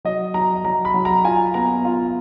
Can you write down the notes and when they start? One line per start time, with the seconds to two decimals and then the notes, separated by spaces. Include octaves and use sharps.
0.05 F#3 D#5
0.34 F#3 A#5
0.64 F#3 A#5
0.85 B5
0.94 F#3
1.05 A#5
1.24 F4 G#5
1.54 B3 A#5
1.85 F4